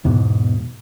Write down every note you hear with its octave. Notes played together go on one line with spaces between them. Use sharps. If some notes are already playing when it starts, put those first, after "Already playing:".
E2 G#2 B2